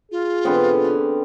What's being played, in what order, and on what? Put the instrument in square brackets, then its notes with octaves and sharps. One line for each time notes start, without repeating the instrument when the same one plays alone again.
[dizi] F4 [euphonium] G#4
[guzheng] B2 E3 [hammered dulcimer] D3 B3 C4
[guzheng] C#4